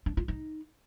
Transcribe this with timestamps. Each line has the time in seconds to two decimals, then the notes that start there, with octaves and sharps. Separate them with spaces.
0.06 D4
0.17 F4
0.28 D#4